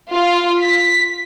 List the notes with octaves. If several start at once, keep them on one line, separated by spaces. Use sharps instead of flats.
F4
B6